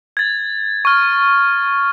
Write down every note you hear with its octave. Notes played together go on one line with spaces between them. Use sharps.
G#6 A6
C#6 F6